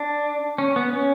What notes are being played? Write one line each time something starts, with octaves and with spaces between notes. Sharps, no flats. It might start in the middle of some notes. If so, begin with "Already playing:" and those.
Already playing: D4
C#4
B3
C#4